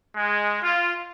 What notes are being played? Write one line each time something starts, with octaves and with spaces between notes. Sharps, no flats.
G#3
F4